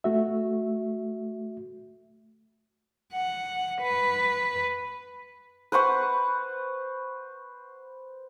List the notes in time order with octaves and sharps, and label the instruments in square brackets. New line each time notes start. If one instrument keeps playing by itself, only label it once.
[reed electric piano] A3 F#4 E5
[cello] F#5
B4
[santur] B4 C5 F#5 C#6